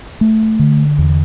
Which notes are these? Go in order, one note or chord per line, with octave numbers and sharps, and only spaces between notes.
A3
D3
E2